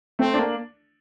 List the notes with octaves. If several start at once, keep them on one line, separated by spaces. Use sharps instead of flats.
A3 C4
D4
A#3